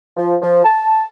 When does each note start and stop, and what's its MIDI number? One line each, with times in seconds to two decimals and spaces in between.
0.17 0.36 53
0.42 0.64 53
0.64 1.05 81